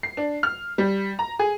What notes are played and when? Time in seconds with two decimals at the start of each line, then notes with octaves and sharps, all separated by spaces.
0.03 C7
0.17 D4
0.43 F6
0.78 G3
1.19 A#5
1.39 G#4